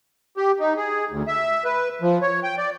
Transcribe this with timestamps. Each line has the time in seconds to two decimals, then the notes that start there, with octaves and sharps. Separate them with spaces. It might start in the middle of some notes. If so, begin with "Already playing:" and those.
0.37 G4
0.60 D#4
0.77 G#4
1.11 D2
1.28 E5
1.65 B4
2.02 F3
2.22 C#5
2.43 G5
2.58 D5